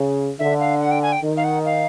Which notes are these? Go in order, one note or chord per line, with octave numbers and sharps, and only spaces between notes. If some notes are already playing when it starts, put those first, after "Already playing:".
Already playing: C#3
D3 E5
F5
F#5
G5
G#5
G5
D#3
F5
F#5
F5